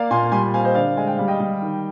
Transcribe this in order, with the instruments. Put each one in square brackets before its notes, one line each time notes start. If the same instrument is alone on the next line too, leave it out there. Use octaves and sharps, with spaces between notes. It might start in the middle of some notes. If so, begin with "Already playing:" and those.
Already playing: [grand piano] A#3 D5 F5
A#2 G#5 C6
G3 G#5 C6
C4 F5 G#5
C5 D#5
D3 D5 F5
G#3 G#5
G5
G3 F5
D#5 G5
G3
D#3